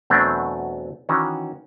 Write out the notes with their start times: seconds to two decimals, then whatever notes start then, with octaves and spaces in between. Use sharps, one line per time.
0.10 E2 B2 F#3 A3 C4 D4
1.09 D#3 E3 C#4 F#4